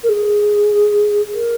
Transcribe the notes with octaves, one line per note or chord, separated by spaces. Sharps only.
A#4
G#4
A#4